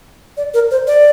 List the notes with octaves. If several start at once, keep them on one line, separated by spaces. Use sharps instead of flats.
D5
A#4
C5
D5